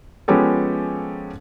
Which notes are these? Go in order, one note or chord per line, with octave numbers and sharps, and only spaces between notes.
F3 G#3 B3 C#4 G4 A4